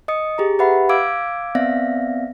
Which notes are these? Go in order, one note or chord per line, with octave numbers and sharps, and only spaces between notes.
D#5 D#6 C#7
G4 G#4 A#5
G4 B4 E5 F#5 B5
F5 D6 E6 G#6 D7
B3 C4 D5 E5 F5 A#6